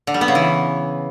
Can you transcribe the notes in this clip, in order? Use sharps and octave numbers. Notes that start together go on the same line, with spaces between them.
D3
G3
B3
C#3
E3